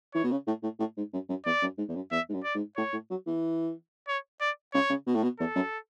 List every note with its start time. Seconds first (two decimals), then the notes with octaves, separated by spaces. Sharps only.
0.14 E3 C#5
0.24 B2
0.31 C#3
0.47 A2
0.63 A2
0.79 A2
0.97 G#2
1.13 F#2
1.29 F#2
1.45 E2 D5
1.62 F#2
1.78 G#2
1.89 E2
1.95 F#2
2.11 E2 E5
2.29 G#2
2.34 F#2
2.44 D5
2.55 G#2
2.76 A2 C#5
2.93 A2
3.10 F#3
3.27 E3
4.08 C#5
4.41 D5
4.73 C#3 C#5
4.90 C#3
5.06 B2
5.15 A2
5.23 B2
5.39 E2 A4
5.55 F#2